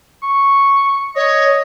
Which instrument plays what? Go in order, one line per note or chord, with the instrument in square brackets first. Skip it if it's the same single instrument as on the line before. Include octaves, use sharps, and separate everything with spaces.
[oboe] C#6
[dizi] C#5 [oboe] D#5